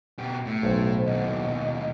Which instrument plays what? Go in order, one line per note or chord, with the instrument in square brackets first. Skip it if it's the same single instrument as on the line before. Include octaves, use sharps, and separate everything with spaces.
[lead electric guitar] B2 G4
A2
[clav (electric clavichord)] B1 [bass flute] C5
[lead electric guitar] D#2 B2 [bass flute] D#5